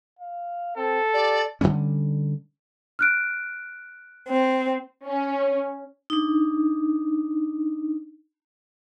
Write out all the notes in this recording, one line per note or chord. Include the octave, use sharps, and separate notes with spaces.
F5
C4 A4
G4 D5
D3 F#3 G3 C#4
F6 F#6 D7
C4
C#4
D4 D#4